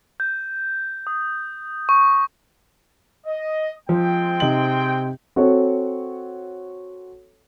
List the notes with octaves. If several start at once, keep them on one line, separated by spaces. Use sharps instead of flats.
G6
D#6
C#6
D#5
F3 G#3 C4 G5
C3 D#4 F#7
C4 F#4 A4 C#5